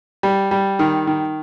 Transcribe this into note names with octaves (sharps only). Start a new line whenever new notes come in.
G3
G3
D#3
D#3